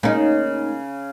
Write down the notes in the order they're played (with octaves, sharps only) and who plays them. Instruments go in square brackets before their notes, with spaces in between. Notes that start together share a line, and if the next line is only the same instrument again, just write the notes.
[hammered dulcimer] C#3 [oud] A#3 D#4